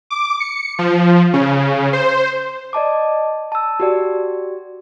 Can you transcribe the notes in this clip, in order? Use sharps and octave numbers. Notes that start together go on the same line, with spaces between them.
D6
C#7
F3
C#3
C5
D5 D#5 A5 D6
A5 E6
F#4 G4 D5